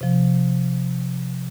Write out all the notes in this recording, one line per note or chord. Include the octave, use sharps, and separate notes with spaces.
C3 F3